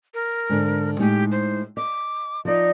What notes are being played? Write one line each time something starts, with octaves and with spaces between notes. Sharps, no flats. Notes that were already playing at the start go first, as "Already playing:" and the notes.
A#4
G#2 D3
A2 G#3 D#4 G4
C5
D#5 D6
F3 D#4 D5